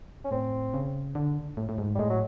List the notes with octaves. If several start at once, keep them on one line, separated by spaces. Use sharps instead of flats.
C#4
A2 C4
C#3
D3
A2
A2
G#2
G3
A2 G#3
F#3